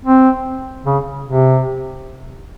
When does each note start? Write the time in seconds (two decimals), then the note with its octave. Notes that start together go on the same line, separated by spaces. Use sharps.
0.05 C4
0.85 C#3
1.26 C3